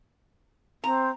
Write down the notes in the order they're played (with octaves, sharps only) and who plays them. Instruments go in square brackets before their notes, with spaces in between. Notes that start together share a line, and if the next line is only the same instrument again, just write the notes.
[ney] C4 [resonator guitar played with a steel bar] A#5